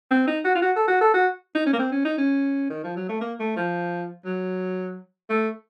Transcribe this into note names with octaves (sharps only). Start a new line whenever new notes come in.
C4
D#4
F#4
F4
F#4
A4
F#4
A4
F#4
D#4
C#4
A#3
C4
C#4
D#4
C#4
D#3
F3
F#3
A3
A#3
A3
F3
F#3
A3